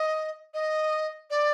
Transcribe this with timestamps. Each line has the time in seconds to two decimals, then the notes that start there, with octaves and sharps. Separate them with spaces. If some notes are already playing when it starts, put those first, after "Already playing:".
Already playing: D#5
0.54 D#5
1.30 D5